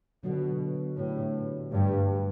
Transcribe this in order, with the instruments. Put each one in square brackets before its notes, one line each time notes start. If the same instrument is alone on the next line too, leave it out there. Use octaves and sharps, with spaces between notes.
[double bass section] B2 [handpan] D3 F#3 B3 F#4 A4
[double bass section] A2 [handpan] A3 D4 G4 B4
[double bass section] G2 [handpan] A3 D4 G4 B4